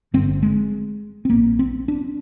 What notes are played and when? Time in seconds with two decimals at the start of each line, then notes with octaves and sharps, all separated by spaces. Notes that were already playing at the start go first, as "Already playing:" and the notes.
0.14 G1 G2 D3 C4
0.43 G#3
1.25 C4
1.30 A#1 A#2 A#3
1.59 C4
1.88 D4